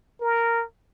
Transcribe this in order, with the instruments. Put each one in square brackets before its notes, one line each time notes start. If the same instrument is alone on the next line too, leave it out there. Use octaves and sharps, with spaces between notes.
[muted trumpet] A#4